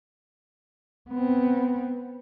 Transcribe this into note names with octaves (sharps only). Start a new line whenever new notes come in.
B3 C4